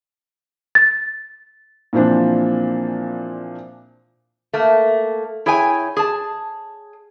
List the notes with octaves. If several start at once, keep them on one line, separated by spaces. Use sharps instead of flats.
A6
A#2 E3 F3 C4 D4
A3 A#3
E4 G#4 C#5 G5 G#5
G#4 A5